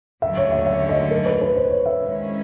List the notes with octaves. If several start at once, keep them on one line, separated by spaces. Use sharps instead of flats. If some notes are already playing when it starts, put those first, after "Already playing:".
D#2 D3 F#3 A3 C#4 E5
C#5
E5
E5
D#5
A#4
B4
B4
C5
C#5
E5
D#3 G#3 C#4 E4